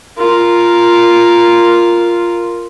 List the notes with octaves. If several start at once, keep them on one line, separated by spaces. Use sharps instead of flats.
F4 A#4